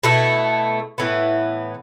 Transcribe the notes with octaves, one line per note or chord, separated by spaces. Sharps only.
B2 A3 E4
A2 E3 B3